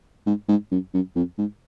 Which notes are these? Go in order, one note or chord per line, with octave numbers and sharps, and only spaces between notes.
G#2
G#2
F#2
F#2
F2
G#2